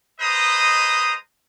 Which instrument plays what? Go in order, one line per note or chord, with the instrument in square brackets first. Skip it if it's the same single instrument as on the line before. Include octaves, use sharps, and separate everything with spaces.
[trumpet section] G#3 B4 C5 D#5 A#5 D#6